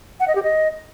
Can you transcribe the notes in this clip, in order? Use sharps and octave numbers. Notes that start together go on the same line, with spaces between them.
F#5
D#5
G4
D#5